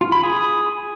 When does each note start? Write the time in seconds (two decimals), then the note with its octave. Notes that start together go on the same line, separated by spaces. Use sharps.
0.01 F4
0.12 B5
0.23 G#4